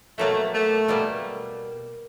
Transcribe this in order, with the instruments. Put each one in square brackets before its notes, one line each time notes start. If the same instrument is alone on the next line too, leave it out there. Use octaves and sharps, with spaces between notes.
[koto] B2 F#3 A#3 [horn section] A3
[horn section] A3
[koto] B2 G3 A#3